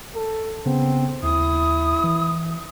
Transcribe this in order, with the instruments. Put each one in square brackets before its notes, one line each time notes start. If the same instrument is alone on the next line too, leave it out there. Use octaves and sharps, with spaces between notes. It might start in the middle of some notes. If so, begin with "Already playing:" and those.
[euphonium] A4
[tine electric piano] C#3 B3 [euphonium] C4
[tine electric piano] D#2 [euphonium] E4 [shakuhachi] D#6
[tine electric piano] E3